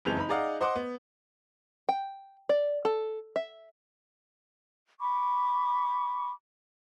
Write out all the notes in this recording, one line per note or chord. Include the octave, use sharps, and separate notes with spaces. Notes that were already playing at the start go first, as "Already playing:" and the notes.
F#1 F2 E3 G#3 G6 F7
D#4 B5
D#4 G#4 D5 D#5 F5 F#5
C5 D#5 F#5 C6 D6
B3
G5
D5
A4
E5
B5 C#6 D6